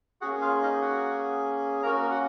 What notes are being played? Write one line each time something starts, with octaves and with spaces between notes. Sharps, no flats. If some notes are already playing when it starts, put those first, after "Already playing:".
A#3 C#4 F#4 G#4 F#5
F4 F5
D#4 D#5
F#4 F#5
A#3 C#4 F#4 A#4 A#5
F#4 F#5